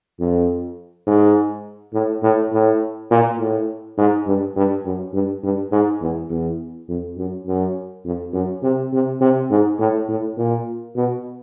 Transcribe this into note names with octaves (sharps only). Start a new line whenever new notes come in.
F2
G#2
A2
A2
A2
A#2
A2
G#2
G2
G2
F#2
G2
G2
G#2
E2
E2
F2
F#2
F#2
F2
F#2
C3
C3
C3
G#2
A2
A2
A#2
B2